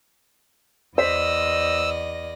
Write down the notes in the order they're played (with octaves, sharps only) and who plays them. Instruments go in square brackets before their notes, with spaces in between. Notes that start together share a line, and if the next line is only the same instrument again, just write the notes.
[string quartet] E2 D5 A#6 [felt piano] C5 B6 [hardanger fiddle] D#5 [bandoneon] E6